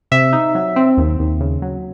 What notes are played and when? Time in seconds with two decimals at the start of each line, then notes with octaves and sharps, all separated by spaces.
0.12 C3 E5
0.33 D#4
0.55 F#3
0.76 C4
0.97 D#2
1.19 D#2
1.40 C#3
1.62 F#3